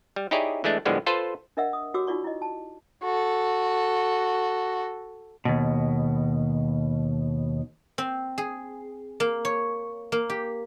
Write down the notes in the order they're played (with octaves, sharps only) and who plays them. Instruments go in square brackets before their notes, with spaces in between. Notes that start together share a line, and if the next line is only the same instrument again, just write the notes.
[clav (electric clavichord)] G3
D#4 E4 G4 G#4 C#5 D5
E3 G#3 A3 D4
A2 D3 F3 G3 G#3 B3
F4 A4 B4 C5
[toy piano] D4 A#4 D#5 E5 F#5 E6
D#6
F#4 G4 C#5 D6 E6
D#4 F4 F#4 D5 C#6
E4 D#5
A5
[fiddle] F#4 A4
[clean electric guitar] D#2 B2
[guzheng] C4
G#4
A#3
C#5
A#3
G4